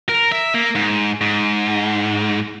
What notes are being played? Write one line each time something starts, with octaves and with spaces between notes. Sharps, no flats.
A#4
E5
A#3
G#2
G#2